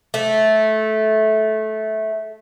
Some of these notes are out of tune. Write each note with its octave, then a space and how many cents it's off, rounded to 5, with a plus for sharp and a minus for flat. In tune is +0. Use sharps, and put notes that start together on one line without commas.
A3 -15